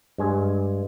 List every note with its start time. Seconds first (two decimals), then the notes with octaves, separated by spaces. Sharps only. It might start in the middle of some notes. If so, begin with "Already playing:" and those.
0.18 G2 G#3 G#5